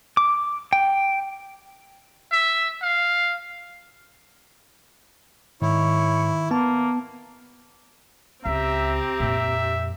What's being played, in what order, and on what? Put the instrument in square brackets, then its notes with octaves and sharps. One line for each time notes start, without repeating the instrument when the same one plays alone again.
[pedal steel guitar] D6
G5
[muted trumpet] E5
F5
[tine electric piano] G#2 [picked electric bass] D#3 [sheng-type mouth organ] E4 [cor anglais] C#5
[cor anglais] A#3 [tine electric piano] B3 A5
[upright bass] C#2 [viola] C4 G4 [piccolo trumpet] E5 [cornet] A#5
[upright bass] F2 A#2 [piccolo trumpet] E5